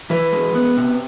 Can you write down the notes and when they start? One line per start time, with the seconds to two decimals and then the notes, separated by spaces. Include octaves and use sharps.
0.10 E3 B4
0.32 G#3
0.55 B3
0.77 C3